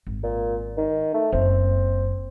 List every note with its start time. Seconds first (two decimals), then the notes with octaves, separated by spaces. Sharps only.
0.07 G#1
0.23 A#2
0.77 D#3
1.14 A3
1.32 F#1 A#3 C4